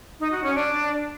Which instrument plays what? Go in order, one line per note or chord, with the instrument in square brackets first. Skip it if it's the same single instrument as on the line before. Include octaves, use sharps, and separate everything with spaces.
[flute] D#4
F#4
C#4
D4